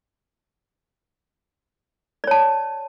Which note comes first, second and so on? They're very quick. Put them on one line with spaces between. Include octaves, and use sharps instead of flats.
D5 C#5 A5